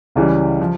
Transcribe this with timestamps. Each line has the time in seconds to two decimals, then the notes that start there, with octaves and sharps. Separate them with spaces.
0.15 C#2 C#3 E3 G3
0.61 F3